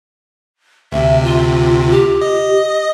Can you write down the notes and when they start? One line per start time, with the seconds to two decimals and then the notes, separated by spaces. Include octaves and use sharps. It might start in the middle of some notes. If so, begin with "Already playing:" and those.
0.92 D2 C3 E5
1.24 F4
1.91 G4
2.21 D#5